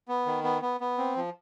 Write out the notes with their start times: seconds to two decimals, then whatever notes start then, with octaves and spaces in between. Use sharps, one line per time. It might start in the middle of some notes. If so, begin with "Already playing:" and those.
0.08 B3
0.26 D#3
0.44 B3
0.62 B3
0.80 B3
0.98 C4
1.16 F3